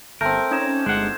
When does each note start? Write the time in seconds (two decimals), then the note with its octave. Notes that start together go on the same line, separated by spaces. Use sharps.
0.21 G1 A3 C4 A#4 G6
0.51 C#4 D#4 D6 G#6 E7
0.86 G1 G#3 F#5 F#6 C7